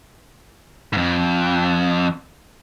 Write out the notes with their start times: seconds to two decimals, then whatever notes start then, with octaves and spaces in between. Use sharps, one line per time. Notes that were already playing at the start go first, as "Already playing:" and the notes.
0.93 F2 G#2